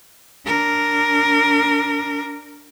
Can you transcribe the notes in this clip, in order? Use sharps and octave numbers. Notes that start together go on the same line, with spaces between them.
D4 A#4